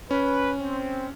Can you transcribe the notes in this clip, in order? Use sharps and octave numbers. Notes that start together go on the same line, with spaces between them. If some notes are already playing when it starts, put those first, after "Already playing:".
C#4 B4
C4